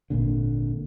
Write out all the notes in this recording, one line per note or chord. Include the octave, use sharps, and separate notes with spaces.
G#1 A#2 D3